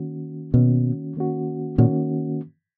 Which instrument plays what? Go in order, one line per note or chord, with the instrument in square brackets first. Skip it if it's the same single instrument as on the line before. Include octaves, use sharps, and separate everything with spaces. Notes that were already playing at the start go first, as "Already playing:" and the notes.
Already playing: [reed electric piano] D#3 A#3 C#4 F#4
[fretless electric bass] B2 [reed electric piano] D#3 A#3 C#4 F#4
[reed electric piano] D#3 A#3 C#4 F#4
[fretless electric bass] A#2 [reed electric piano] D#3 A#3 C#4 F#4